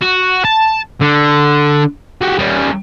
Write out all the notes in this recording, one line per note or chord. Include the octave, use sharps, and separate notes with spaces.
F#4
A5
D3
F#4 G4
G3 C#4